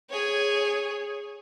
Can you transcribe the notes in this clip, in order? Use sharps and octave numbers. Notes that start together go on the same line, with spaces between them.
G#4 C#5